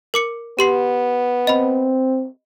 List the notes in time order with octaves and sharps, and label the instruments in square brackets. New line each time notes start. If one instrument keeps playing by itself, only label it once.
[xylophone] A#4 D6 C#7
[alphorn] B3 [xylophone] G4 C6 C7
[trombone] C4 [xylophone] D#5 B5